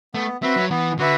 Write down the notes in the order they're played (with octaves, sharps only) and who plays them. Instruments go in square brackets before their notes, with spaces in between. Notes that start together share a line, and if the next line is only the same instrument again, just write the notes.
[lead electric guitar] A3 [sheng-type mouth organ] B3
[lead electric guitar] C4 [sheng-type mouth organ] F#4 B4 E5
[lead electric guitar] F#3
[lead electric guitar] E3 [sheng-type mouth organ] B3
[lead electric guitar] D3 [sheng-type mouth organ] F#4 B4 E5